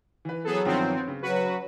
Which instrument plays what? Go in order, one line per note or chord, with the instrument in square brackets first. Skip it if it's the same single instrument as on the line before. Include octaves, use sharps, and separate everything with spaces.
[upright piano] E3 B4
[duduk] F#3 [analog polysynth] B3 G#4 A4
[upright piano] G2 D#3 F3 [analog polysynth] B3 C4
[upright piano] C#3
[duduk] F#3 [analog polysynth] F#4 B4